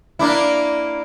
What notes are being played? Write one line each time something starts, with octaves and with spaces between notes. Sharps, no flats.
A#3 D4 E4